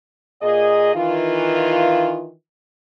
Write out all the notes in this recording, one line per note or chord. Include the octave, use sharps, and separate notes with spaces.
A#2 G#4 D#5
D#3 E3 F4